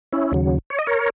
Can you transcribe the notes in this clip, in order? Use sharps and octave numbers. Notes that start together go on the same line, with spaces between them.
C#4 E4
D#2 C#3 F#3
C#5
D#5
A#4 C#5